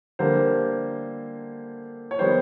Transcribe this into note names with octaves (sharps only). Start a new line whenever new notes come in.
D3 G3 A#3 C5
C#5
D#3 G3 B3 C5